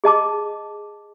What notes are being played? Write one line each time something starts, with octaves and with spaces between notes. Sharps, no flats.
G#4 D#5 A5 D6